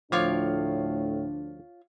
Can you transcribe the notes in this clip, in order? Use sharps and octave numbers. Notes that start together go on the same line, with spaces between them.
D2 A2 F3 D4 F4 C#5 D6